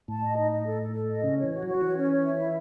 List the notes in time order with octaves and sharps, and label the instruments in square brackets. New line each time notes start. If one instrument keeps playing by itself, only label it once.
[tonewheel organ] A2 [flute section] A5
[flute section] D#5
D#4
D#5
A4
A4
A4
D#5
[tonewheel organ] C#3 [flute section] C#4
[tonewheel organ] E3 [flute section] C#5
[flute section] F#4
[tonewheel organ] F#3
[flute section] F#4
[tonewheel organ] F#3
[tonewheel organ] E3 [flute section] C#5
[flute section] C#4
C#5
E5
E4